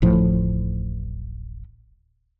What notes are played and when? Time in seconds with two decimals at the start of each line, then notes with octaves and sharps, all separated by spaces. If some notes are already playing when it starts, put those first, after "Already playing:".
0.02 D1 A1 A2 F3